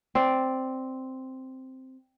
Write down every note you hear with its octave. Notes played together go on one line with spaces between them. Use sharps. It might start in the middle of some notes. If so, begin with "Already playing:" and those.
C4 D5